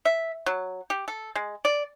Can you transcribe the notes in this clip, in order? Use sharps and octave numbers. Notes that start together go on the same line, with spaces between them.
E5
F#3
G4
A4
G#3
D5